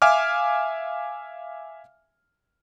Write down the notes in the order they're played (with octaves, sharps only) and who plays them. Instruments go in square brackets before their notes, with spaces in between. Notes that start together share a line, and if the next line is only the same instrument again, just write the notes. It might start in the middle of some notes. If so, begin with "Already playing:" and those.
[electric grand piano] E5 F5 G#5 D6 F6